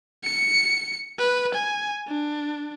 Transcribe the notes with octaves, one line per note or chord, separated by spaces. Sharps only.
C#7
B4
G#5
D4